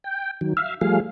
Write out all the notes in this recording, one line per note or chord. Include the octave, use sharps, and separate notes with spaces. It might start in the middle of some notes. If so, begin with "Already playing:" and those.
G5
D#3 F#3
E5 F5
F3 G3 A3 G#4 F5